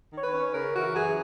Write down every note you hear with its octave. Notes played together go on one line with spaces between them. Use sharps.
D#3 C#5
B4
C#4
C#3 A#4
E3 F#4
F#2 G#4